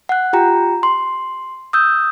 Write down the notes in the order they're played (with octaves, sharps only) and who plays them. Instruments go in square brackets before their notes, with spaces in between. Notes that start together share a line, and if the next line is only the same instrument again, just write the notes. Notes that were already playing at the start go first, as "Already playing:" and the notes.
[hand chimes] F#5 F#6
F4 G4 G5 A#5
C6
D#6 E6 G6